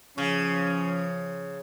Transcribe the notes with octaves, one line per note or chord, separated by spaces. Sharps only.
C#3 F3 C#4